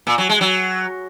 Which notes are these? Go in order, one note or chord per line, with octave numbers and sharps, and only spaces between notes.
A#2
F#3
G#3
F#3